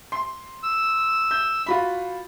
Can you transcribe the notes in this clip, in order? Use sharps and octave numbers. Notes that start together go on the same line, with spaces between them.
C6
E6
G6
F4 F#4 B5